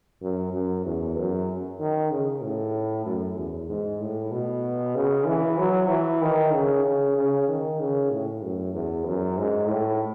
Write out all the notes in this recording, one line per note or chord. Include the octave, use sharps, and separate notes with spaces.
F#2
F#2
E2
F#2
D#3
C#3
A2
F#2
E2
G#2
A2
B2
C#3
E3
F#3
E3
D#3
C#3
C#3
C#3
D#3
C#3
A2
F#2
E2
F#2
G#2
A2